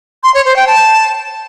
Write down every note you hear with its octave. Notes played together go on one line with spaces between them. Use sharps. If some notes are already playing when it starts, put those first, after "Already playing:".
C6
C#5
C5
G5
A5